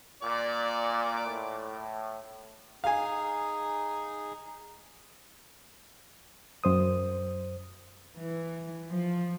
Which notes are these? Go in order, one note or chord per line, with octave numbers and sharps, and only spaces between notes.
A#2 D5 D6
A2
D#4 G#4 F5 G#5
F#2 C5 D#6
E3
F3